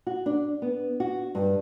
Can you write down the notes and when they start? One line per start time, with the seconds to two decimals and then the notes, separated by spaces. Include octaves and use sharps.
0.07 F#4
0.26 D4
0.62 B3
1.00 F#4
1.35 G2